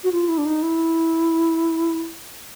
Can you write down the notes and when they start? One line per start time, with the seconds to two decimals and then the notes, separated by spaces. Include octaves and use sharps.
0.04 F#4
0.12 F4
0.28 E4
0.38 D4
0.46 D#4
0.62 E4